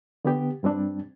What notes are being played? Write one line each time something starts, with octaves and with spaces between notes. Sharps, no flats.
D3 B3 G4
G2 G3 C4 D4